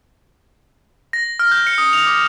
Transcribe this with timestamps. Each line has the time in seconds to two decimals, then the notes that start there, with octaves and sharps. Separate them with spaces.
1.13 A#6
1.39 F6
1.51 G6
1.67 C#7
1.78 D#6
1.93 F7
2.07 D6